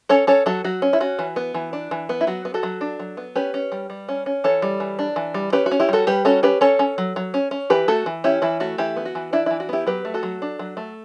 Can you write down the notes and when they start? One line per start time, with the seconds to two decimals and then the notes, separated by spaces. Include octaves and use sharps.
0.09 C#4 A4 C#5
0.27 C#4 A4 C#5
0.46 F#3 F#4 A4
0.64 F#3 F#4
0.82 C#4
0.93 E4
1.00 C#4 F#4
1.19 E3
1.36 B3
1.54 E3
1.73 D4
1.91 E3
2.09 B3
2.21 E4
2.27 F#3 F#4
2.45 B3
2.54 F#4 A4
2.63 F#3
2.81 D4
2.99 F#3
3.17 B3
3.35 C#4 G4 B4
3.54 C#4
3.72 G3
3.90 G3
4.09 C#4
4.26 C#4
4.44 E3 A4 C#5
4.62 G3
4.80 E3
4.99 D4
5.16 E3
5.34 G3
5.53 C#4 G4 B4
5.66 F#4
5.71 C#4
5.80 E4 G4
5.89 G3 F#4 A4
6.07 G3 G4 B4
6.25 C#4 F#4 A4
6.43 C#4 G4 B4
6.61 C#4 A4 C#5
6.79 C#4
6.98 F#3
7.16 F#3
7.34 C#4
7.51 C#4
7.70 E3 G4 B4
7.88 A3 F#4 A4
8.06 E3
8.24 C#4 E4 G4
8.42 E3 E4
8.60 A3 F#4
8.78 E3 E4 G4
8.96 B3
9.05 F#4
9.15 E3
9.33 D4 E4
9.46 E3 E4
9.60 F#4
9.69 B3 E4 G4
9.87 F#3 G4 B4
10.05 A3
10.14 F#4 A4
10.23 F#3
10.42 D4
10.59 F#3
10.77 A3